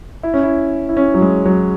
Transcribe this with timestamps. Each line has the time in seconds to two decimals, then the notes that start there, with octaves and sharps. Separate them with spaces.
0.23 E4
0.34 C#4
0.43 E4
0.89 E4
0.97 C#4
1.14 F#3
1.21 G#3
1.45 F#3